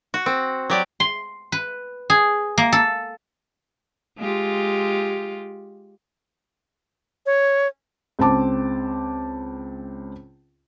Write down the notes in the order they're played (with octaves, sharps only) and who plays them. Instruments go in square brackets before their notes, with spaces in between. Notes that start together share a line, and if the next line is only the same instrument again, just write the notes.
[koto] F#4
C4
F#3 G4 D5
[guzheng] C6
B4
G#4
A#3
A4
[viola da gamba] G#3 F4 G4
[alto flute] C#5
[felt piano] C#2 C4 C5 A5 D6